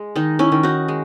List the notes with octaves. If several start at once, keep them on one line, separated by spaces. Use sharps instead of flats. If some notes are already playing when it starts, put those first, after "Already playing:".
Already playing: G#3
D#3 D#4
C#4 E4
D#3
D#4 F#4
G#3